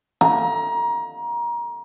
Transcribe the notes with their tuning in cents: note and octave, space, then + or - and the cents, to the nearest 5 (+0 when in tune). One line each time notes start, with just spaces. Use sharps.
A#5 +25